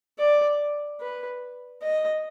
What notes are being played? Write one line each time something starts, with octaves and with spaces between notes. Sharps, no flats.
D5
B4
D#5